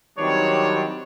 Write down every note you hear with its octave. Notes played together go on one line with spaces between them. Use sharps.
D#3 F#3 G3 C4 D4 C#5